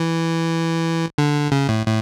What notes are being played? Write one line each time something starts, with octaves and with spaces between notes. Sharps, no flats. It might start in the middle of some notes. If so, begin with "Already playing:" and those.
Already playing: E3
D3
C#3
A2
A2